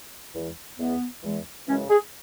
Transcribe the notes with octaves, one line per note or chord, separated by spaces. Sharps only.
E2 E3 G#3
E2 E3 G#3 B3
E2 E3 G#3
F#2 C#3 E3 G#3 C#4
G#4